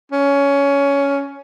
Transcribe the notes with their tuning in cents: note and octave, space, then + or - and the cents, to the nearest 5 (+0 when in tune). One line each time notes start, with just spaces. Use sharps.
C#4 +15